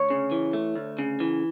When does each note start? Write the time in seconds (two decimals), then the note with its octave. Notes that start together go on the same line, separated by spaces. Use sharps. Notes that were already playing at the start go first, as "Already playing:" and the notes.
Already playing: D2 C#5
0.10 C#3
0.31 E3
0.53 A3
0.75 D2
0.99 C#3
1.20 E3